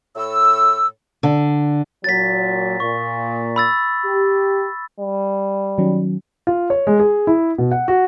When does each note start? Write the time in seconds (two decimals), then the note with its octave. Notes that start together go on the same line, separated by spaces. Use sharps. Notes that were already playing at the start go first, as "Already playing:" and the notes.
0.16 A2 E6
1.23 D3
2.04 A#2 F#3 A6 B6
2.80 A#2 C#6
3.56 B5 E6 A6
4.05 G4
5.00 G3
5.78 D#3 F#3 C#4
6.47 F4
6.70 C#5
6.87 G#3
7.00 G#4
7.27 E4
7.58 B2
7.71 F#5
7.88 F#4